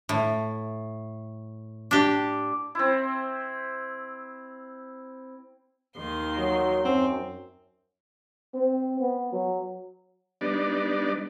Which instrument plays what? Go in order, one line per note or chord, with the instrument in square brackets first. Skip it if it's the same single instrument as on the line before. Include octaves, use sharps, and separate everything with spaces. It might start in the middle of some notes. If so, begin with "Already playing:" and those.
[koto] A2
D4 G4
[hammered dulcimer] C4 E4
[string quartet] D#2 D#3 C6
[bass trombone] F#3
[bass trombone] F#2 [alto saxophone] C4
[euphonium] C4
B3
F#3
[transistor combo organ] G3 B3 D4 D#4 D5